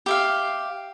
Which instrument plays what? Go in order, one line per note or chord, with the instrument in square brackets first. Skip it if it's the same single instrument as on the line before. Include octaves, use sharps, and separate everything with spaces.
[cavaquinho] G4 E5 F5